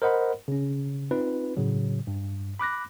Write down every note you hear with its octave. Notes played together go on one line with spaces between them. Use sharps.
A#4 C5 D#5 F#5 B5
C#3 C#4
C4 D#4 F4 B4
A2 C#3 F#3
G2
B5 D6 F#6 A#6